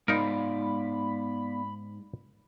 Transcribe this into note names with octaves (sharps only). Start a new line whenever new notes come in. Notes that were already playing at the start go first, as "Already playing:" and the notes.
G#2 B3 D#4 A#4 D5 F5 B5